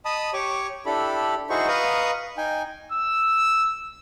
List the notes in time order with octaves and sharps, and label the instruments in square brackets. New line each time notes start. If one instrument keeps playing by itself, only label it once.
[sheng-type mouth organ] D#5 A5 B5 D#6
G4 C#5 C#6 D6
D4 E4 G4 A4 B5
D#4 E4 F#4 G#4 C5 C#6
B4 D#5 F5 A#5 C#6 D#6
D#4 G5 G#5
[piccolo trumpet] E6